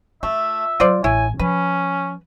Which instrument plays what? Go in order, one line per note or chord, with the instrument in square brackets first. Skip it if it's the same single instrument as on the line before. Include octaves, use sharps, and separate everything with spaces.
[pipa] A3 [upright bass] F4 [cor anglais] E5
[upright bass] F#3 [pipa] F4 C5 D5
[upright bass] A1 [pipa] E4 C#5 [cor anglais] G#5
[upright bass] F3 [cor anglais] C#4 [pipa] B4